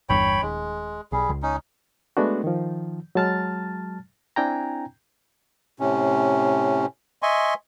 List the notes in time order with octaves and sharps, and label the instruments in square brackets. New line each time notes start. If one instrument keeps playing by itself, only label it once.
[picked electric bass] G1 E2 G2 [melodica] C#5 G5 B5
[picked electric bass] D#1 [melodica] G#3
[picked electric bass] B1 [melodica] G3 G#4
[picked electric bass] C#2
[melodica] C#4 D#4
[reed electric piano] G#3 A3 B3 D4 F#4
D#3 F3
F#3 G#3 A5 F6 A6
C4 D4 E4 G5 G#5 A#5
[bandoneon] A2 C3 C#4
D#5 E5 G#5 C6 C#6